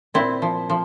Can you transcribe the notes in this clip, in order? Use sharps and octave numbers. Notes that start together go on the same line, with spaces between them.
A#2 C4 E4
F3
F3